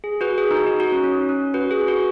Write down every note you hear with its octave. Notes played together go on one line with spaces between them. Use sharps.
G#4
F#4 B4
G#4
D#4
F#4
D#4
F#4
C#4
C#4
C#4
F#4 B4
G#4
F#4 B4